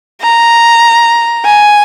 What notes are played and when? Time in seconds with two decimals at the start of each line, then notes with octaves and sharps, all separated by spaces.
0.22 A#5
1.45 G#5